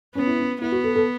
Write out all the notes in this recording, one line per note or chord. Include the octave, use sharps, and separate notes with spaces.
B3 C#4
E4
C#4
B3 E4
F#4
A4
A4